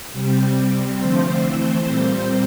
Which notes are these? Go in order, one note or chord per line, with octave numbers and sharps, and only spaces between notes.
C3 G3 C4
C3 G3 C4
D3 F3 A3 C4 C5
E3 A3 C4 C5
A#2 G3 C4 C5